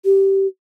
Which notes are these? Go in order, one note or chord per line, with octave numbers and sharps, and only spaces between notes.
G4